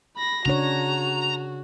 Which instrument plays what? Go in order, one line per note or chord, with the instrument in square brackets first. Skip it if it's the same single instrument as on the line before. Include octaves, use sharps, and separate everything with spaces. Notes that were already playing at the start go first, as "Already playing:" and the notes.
[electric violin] B5 A#6
[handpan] C#3 D4 C#5 [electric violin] F#4 [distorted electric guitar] A#5